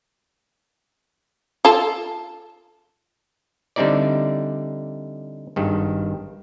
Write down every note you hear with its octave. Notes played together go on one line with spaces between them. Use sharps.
F4 A4
D3 G3 C4 D#4 E4 D5
G#1 G2 D#3